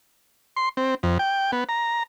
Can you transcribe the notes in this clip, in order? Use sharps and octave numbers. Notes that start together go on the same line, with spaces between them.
C6
C4
F2
G5
B3
A#5